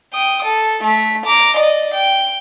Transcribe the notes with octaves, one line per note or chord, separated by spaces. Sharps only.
G5 D#6
A4
A3 B6
A#5 D6
D5 D#5
G5